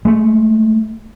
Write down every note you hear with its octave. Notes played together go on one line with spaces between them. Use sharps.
G#3 A3